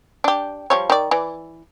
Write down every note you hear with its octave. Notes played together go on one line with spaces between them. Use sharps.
D4 G4
F3 G3 C#5
D#3 D5
E3 D5